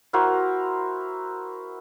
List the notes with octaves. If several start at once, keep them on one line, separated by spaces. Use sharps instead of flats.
E4 F#4 A#4 C5